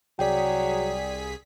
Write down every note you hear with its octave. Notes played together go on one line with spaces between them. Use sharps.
C2 F#3 G#4 D5 G5 B6